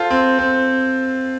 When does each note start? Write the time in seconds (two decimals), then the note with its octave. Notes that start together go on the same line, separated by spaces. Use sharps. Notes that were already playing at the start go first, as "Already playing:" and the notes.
Already playing: F4 A4 C5
0.11 C4
0.39 C4